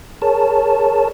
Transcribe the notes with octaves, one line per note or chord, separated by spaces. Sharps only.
G#4 A#4 C#5 A5